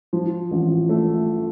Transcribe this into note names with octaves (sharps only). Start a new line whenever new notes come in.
F3
A1
A3